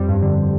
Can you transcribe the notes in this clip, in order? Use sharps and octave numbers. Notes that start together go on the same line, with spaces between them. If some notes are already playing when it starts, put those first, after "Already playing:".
Already playing: F2 G3 C4
G2
D3